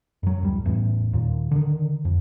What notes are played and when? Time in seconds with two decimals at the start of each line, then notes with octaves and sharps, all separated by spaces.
0.23 F#2 F#3
0.43 D1 G3
0.65 E2 A2
1.13 D#2 A#2
1.51 D3 D#3
2.05 F2